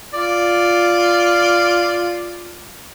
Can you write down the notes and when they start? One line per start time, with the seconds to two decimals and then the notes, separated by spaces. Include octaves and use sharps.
0.14 F4 D5